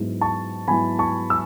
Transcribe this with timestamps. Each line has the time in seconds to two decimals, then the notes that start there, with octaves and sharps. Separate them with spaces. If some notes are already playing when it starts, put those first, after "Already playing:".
Already playing: G#2 F#3 B3 E4
0.21 A5 C#6
0.68 G#2 F#3 B3 E4 G#5 B5
0.99 A5 C#6
1.30 E6